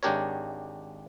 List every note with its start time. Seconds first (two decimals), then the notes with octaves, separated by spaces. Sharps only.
0.03 G#1 G#3 D4 G4 A#4 C#5